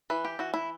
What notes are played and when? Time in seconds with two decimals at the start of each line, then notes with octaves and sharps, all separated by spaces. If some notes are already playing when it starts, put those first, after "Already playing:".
0.10 E3 B4
0.25 G4
0.39 E3 F#4
0.54 E4